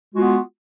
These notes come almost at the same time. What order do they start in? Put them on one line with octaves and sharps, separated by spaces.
G#3 F#4 F4 B3